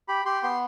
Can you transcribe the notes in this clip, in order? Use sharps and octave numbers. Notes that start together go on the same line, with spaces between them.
G4 B5
G4 C6
B3 C6